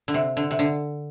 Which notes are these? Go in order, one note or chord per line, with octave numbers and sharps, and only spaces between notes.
D3
C3
D3
C3
D3